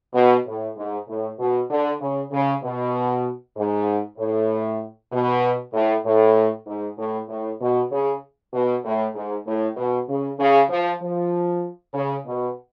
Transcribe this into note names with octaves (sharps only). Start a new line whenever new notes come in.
B2
A2
G#2
A2
B2
D3
C#3
C#3
B2
G#2
A2
B2
A2
A2
G#2
A2
A2
B2
C#3
B2
A2
G#2
A2
B2
C#3
C#3
F3
F3
C#3
B2